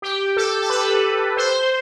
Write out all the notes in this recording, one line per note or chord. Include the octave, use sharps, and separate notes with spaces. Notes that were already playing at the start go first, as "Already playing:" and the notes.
G4
A4
A4
B4
C5